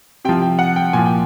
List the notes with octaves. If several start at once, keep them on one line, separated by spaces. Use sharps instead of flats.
C3 F3 G5
G5
F#5
G5
A#2 F3 G#5
G5